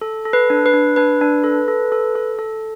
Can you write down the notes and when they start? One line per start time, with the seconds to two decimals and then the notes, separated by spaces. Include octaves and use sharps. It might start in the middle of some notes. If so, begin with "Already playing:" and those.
0.01 A4
0.25 A4
0.33 B4
0.50 D4
0.66 B4
0.74 D4
0.96 D4 B4
1.21 D4
1.44 A4
1.68 A4
1.92 A4
2.15 A4
2.39 A4